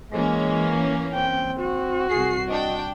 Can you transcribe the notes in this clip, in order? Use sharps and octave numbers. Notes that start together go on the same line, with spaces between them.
E3 G#3 A#3 C#4
C4 G5
F#4
C2 G#4 C7
D4 D#5 G5